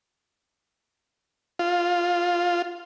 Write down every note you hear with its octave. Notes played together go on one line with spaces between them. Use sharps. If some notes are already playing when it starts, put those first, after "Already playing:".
F4